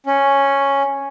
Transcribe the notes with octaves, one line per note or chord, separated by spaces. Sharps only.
C#4